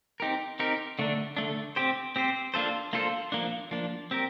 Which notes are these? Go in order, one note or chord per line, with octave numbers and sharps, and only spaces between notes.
C4 D#4 G4 A#4
C4 D#4 G4 A#4
D3 A3 D4
D3 A3 D4
C4 G4 C5
C4 G4 C5
A#3 D4 F4 A4 C5
A#3 D4 F4 A4 C5
F3 A#3 D4
F3 A#3 D4
C4 G4 A#4